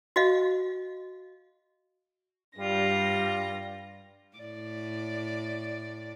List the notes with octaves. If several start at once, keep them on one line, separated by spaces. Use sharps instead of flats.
F#4 D#5 F5
G2 G3 F4 A#6
A2 D5